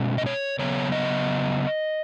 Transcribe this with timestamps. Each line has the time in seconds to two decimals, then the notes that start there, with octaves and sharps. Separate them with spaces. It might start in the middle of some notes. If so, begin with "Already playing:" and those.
Already playing: B2 G#3 C#4
0.18 D#5
0.26 C#5
0.59 C#3 F#3 B3 C#5
0.92 D#5